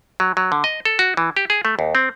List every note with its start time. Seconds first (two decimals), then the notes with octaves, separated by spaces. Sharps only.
0.20 F#3
0.37 F#3
0.52 D3
0.64 D#5
0.85 A4
0.99 F#4
1.17 E3
1.37 G4
1.50 G#4
1.65 A3
1.79 D#2
1.95 C4